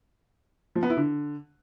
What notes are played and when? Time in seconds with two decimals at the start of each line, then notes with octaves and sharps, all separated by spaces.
0.75 F3
0.83 B3
0.90 E4
0.97 D3